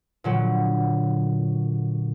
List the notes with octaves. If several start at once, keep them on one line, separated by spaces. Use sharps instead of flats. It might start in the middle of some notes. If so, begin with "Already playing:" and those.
A#2 D3 F#3